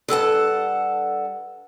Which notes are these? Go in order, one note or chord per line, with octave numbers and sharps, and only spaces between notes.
G2 A4 F#5 A5